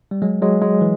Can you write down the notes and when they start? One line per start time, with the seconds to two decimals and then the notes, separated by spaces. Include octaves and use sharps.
0.11 G3
0.22 F#3 G#3
0.42 F#3 G#3
0.62 F#3 G#3
0.81 E3